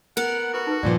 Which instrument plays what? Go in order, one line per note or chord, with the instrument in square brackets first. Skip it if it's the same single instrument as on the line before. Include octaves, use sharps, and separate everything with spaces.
[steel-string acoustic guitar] B3 A#4 [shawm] F#5
[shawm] F#4 [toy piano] A4 B4 B5
[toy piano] D#4 A4 B4
[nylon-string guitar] G2 A#2 F3 [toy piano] D5